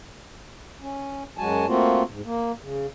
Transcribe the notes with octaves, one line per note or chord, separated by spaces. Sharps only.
C#4
F#2 F#3 G#3 F#4 G#5 A5
A3 A#3 C4 F4 F#4
G#2
A#3
C#3